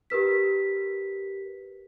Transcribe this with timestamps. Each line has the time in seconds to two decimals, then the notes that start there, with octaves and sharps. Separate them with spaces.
0.10 G4 A#4 B4 B6